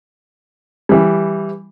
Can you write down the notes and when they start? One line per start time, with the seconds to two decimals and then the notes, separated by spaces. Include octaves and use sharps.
0.89 E3 G3